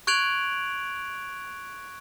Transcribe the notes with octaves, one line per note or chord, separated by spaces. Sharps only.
C#6 F#6 G#6 D7 F7 F#7